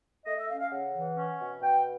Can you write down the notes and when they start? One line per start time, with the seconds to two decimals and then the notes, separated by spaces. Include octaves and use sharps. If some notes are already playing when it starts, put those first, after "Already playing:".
0.25 A3 D#5
0.37 E5
0.48 C#4 F5
0.59 F5
0.70 C#3 F#5
0.94 E3
1.16 C#4
1.38 B2
1.61 B2 G5